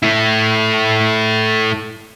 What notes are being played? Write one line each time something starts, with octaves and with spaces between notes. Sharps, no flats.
A3 E4